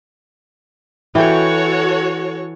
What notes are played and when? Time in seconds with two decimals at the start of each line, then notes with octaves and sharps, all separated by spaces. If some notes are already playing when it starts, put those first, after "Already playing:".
1.15 E3 F#4 A4 C#5 G5